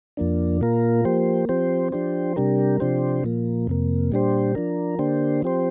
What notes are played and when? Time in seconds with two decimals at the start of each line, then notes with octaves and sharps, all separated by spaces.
0.17 F2 F3 A#3 D4
0.61 A#2 A#3 F4 A#4
1.05 F3 A#3 G4 C5
1.49 F3 C4 G4 C5
1.92 F3 D4 G4 C5
2.36 C3 G3 D4 G4 A#4
2.80 C3 F3 D4 G4 C5
3.24 A#2 F3 A#3
3.67 F2 C3 A#3
4.12 A#2 G3 D4 G4 C5
4.55 F3 D4 A#4
4.99 D3 A#3 D4 G4 C5
5.42 F3 C4 G4 C5